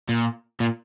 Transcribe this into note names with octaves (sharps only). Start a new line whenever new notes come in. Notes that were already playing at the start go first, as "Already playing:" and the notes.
A#2
A#2